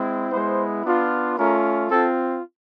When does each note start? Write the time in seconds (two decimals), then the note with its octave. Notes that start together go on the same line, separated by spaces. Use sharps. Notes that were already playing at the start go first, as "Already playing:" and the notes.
Already playing: G#3 C4 E4
0.31 G#3 B3 E4 C5
0.84 B3 D4 F4
1.37 A3 C#4 F4 A#4
1.90 C4 F4 A4